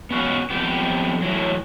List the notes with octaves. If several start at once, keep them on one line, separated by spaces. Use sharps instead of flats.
B3 C#4 F#4 E5 F5
F2 B3 G4
A2 E3 F#3